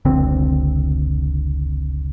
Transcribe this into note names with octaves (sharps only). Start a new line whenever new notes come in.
F1 C#2 D3 C4